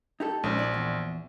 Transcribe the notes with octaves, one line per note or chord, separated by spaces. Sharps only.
D#4 G4 A4
A#1 G#3 C#4 D#4
D5
E2